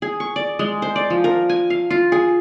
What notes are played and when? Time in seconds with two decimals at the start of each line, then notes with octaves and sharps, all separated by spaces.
0.02 G#4
0.20 C#6
0.36 D5
0.59 G#3
0.82 C5
0.96 D5
1.10 F3
1.24 A#4
1.49 G#5
1.70 F5
1.90 F4
2.12 G#4